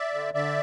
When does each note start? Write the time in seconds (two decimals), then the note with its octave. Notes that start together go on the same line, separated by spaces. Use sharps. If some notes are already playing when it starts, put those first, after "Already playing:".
Already playing: D5 E5
0.14 D3
0.34 D3 D5 E5